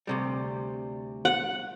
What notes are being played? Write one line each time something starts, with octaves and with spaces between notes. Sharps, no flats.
D2 C3 G3
F#5